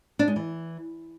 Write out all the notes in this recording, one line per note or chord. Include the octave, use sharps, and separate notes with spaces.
D4
G#3
E3